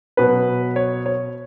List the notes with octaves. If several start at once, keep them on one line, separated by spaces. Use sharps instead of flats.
B2 F#3 B4
C#5
C#5